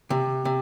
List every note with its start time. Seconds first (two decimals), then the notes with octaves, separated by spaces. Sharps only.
0.10 C3
0.45 C3